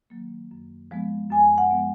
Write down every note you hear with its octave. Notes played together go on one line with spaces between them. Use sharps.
D#3 F#3 A#3
F#2
F3 G#3 B3
F#2 G#5
F#5
F3 G#3 B3